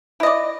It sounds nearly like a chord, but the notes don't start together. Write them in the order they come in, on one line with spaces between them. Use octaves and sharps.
E4 D#5 D5